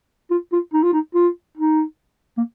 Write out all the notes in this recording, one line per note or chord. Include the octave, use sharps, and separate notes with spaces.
F4
F4
D#4
F4
D#4
F4
D#4
A#3